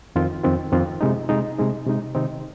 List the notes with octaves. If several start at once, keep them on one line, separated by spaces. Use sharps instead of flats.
F2 D#3 C4 F4
F2 D#3 C4 F4
F2 D#3 C4 F4
C3 G#3 D#4
C3 G#3 D#4
C3 G#3 D#4
C3 G#3 D#4
C3 D#3 C4 D#4